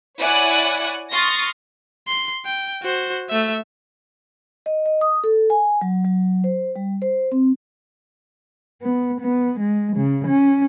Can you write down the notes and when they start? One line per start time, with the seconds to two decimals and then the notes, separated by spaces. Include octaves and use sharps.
0.18 E4 C#5 D5 F#5 G#5 F#6
1.12 C6 C#6 D#6 F6 A6 A#6
2.08 C6
2.46 G5
2.82 F#4 C5
3.30 A3 E5
4.66 D#5
4.86 D#5
5.01 D#6
5.24 A4
5.50 G#5
5.81 F#3
6.05 F#3
6.44 C5
6.76 G3
7.02 C5
7.32 C4
8.83 B3
9.22 B3
9.61 G#3
9.96 C#3
10.27 C#4